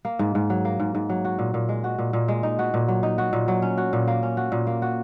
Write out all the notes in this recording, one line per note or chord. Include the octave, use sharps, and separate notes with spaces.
A#3
G#2
G#2
F#3
A#3
G#2
G#2
F#3
F#4
A#2
A#2
G#3
F#4
A#2
A#2
G#3
D#4
F#4
A#2
F#3
D#4
F#4
A#2
F#3
C#4
F#4
A#2
A#3
C#4
F#4
A#2
A#3
F#4